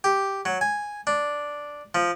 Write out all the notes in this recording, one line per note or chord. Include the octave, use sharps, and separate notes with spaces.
G4
F#3
G#5
D4
F3